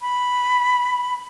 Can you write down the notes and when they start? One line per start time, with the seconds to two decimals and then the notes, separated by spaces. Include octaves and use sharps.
0.01 B5